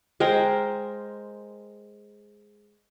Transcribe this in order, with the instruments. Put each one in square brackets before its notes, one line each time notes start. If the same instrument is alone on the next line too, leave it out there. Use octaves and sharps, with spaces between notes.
[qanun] G#3 A#4 C5 G5